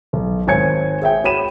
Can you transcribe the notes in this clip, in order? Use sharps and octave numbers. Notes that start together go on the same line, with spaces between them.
B1
G#1 C#5 G#5 G#6 C#7
G#4 E5 G5
F#4 C#5 G5 B5 D#7 E7